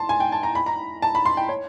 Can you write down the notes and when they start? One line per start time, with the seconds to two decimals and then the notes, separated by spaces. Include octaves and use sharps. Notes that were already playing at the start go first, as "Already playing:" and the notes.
Already playing: A5 C6
0.09 G#5
0.20 G5
0.32 A5
0.43 A#5
0.55 B5
0.66 A#5
1.02 A5
1.15 B5
1.26 C6
1.37 G5
1.49 C#5